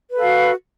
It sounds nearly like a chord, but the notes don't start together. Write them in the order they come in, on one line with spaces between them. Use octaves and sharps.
B4 A4 F5 F#4